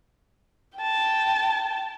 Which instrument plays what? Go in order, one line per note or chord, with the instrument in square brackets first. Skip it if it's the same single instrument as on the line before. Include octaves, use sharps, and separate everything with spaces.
[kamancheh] G5 A5